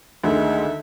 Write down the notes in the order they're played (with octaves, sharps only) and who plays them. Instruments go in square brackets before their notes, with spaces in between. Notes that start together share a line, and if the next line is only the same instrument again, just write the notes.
[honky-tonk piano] D2 [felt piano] D3 D#3 [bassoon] G#3 [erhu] E5